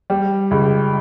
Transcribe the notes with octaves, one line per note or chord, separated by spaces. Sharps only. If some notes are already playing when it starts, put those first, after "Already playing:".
G3
C#2